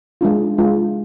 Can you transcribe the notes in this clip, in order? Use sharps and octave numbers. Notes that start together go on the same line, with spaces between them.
G#3 D4 F4
G#3 D4 F4